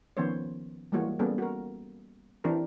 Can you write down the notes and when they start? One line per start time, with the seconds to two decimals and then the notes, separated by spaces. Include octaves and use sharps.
0.17 D#3 F3 B3 C#4 C5 C#5
0.92 E3 G3 G#3 A#3 F#4 C#5
1.19 G3 A#3 B3 C#4 G#4 A4
1.38 F#4 A#4
2.44 E3 C4 D4 G4 A#4